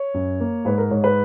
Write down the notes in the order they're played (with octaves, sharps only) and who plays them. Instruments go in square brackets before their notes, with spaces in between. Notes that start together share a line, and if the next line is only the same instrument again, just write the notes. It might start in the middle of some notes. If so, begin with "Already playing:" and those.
Already playing: [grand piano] C#5
F#2
A#3
G#2 B4
A#4
G#2 C#5
B4